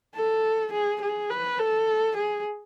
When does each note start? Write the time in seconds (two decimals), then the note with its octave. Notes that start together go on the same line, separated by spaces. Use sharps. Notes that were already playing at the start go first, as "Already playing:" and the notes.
0.15 A4
0.72 G#4
1.01 G#4
1.30 B4
1.59 A4
2.17 G#4